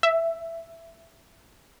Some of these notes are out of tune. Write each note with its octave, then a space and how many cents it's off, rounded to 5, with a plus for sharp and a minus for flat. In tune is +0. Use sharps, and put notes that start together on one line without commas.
E5 +10